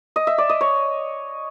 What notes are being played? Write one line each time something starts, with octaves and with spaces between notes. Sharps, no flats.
D#5
E5
D5
D#5
C#5